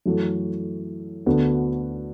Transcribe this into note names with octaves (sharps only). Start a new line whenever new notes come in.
F#2 E3 A3 F#4 A4
D2 D3 B3 F#4